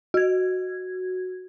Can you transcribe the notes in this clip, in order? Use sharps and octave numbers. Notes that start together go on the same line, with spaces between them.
F#4 G#6